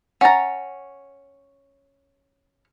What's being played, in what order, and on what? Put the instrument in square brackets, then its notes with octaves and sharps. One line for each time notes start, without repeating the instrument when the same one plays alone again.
[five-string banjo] C#4 A#5 [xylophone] F#5 A6